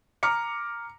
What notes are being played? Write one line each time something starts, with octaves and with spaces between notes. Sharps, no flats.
A#5 D6 F6 C#7